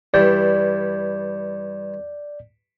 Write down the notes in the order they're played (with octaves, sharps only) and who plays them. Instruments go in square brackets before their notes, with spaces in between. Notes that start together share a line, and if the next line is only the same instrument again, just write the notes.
[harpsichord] G2 E3 G3 [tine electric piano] D5 G6